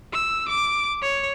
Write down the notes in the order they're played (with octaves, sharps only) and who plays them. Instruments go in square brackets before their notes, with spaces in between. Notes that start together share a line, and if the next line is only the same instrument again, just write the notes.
[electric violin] E6
D6
C#5